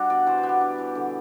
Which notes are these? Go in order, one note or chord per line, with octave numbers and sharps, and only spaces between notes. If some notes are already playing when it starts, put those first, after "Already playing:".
Already playing: G3 D4 F#4
B2 D5
E3 C5
B4
B3
G4
D4
E3
D3